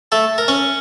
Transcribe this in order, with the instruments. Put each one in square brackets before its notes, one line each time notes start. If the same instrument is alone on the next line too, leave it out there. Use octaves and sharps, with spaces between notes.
[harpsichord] A3 A4
A#4
C#4 C#5